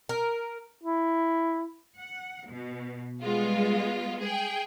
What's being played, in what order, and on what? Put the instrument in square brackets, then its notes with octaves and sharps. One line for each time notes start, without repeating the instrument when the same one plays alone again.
[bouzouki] A#4
[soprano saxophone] E4
[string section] F#5
B2
G3 G#3 B3 F4
G#4 G5